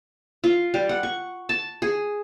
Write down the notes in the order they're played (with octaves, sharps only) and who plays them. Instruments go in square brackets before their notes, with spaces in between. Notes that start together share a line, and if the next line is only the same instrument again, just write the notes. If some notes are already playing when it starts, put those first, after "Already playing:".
[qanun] F4
G3
F#5
C#6
A5
G#4